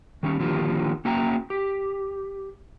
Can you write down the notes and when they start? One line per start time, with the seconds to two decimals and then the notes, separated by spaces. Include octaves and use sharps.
0.23 D#3 G3 C#4
0.40 D3 D#3 F3 A#3 F4 G4
1.05 A#3 C#4 F#4 E5 G5 A#5
1.50 G4